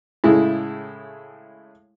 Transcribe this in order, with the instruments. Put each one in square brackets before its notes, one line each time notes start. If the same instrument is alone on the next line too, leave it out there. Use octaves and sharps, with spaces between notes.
[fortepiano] A2 C#3 G#3 E4